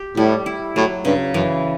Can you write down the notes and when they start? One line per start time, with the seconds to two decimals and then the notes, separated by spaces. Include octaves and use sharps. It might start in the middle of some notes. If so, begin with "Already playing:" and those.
Already playing: G4
0.17 A2 G3
0.46 E4
0.76 A2 F#3
1.05 G2 C#3
1.34 F#2 E3